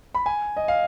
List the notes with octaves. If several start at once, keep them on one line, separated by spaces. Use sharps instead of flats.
B5
G#5
D#5
F5